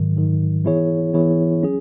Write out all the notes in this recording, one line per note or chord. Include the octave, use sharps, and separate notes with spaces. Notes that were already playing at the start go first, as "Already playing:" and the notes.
Already playing: G#2 D#3 F#3
G#2 D#3 F#3
E3 B3 E4 G#4 C#5
E3 B3 E4 G#4 C#5
F#3 C#4 G#4